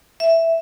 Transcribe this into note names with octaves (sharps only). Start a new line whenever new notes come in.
E5